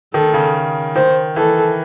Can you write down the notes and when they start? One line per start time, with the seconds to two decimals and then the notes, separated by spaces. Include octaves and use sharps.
0.14 D#3 A4
0.34 C#3
0.95 D#3 C5
1.36 E3 A4